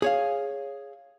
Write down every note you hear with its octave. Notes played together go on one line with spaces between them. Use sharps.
G#4 C#5 F5